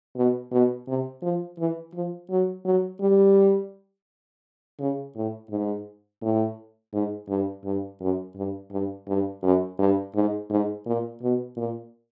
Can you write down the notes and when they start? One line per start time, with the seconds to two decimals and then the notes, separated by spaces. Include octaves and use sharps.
0.16 B2
0.51 B2
0.87 C3
1.22 F3
1.59 E3
1.94 F3
2.30 F#3
2.65 F#3
3.01 G3
4.79 C#3
5.15 A2
5.50 G#2
6.22 A2
6.93 G#2
7.28 G2
7.64 G2
8.00 F#2
8.36 G2
8.71 G2
9.08 G2
9.43 F#2
9.79 G2
10.15 G#2
10.50 G#2
10.86 A#2
11.22 B2
11.57 A#2